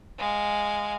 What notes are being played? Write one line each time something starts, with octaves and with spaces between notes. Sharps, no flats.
G#3 F5